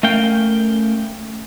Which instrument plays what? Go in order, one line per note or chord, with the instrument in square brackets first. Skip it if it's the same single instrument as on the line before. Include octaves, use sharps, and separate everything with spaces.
[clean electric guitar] A3 C#4 A#4 F5 G5